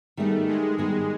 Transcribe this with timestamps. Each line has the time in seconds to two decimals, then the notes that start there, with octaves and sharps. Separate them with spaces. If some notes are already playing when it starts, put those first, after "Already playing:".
0.17 D#3 G3 A3 B3 D#4 G#4
0.48 G#3
0.78 D#3 G3 G#3 B3 D#4 G#4